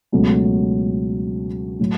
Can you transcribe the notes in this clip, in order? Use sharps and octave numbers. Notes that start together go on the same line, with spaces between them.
C#2 B2 F#3 A3 C#4
A2 F#3